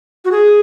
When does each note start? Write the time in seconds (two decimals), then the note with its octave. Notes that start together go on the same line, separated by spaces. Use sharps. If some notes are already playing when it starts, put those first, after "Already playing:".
0.25 F#4
0.32 G#4